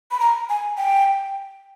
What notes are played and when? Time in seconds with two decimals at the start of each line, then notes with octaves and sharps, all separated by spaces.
0.11 B5
0.20 A#5
0.50 G#5
0.78 G5